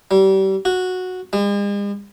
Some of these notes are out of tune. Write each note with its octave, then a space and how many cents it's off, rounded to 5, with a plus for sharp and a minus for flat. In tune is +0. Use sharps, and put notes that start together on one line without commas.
G3 -30
F#4 -10
G#3 -45